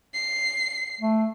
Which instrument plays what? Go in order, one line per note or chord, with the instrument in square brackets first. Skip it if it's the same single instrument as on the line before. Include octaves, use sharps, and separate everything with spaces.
[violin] C7
[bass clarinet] A3